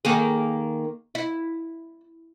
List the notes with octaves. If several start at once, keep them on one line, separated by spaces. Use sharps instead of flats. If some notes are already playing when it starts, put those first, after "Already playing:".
D#3 A#3 G#4
E4